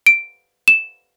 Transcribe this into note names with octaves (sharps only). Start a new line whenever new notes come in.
D7
E7